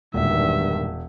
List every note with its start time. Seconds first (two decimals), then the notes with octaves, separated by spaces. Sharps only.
0.14 E1 G2 A#2 D#3 G#3 E5